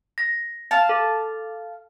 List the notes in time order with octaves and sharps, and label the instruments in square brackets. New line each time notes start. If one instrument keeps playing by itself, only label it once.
[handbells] A#6
[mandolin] F5 A5
[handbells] A4